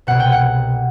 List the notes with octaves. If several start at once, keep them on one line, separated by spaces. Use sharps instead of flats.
C2 B2 F#5
G5
F#5